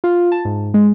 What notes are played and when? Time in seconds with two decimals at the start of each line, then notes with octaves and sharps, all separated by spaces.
0.04 F4
0.32 A5
0.45 G#2
0.74 G#3